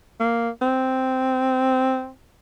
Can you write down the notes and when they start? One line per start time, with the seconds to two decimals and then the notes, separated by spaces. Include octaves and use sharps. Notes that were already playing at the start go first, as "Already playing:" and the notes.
0.20 A#3
0.62 C4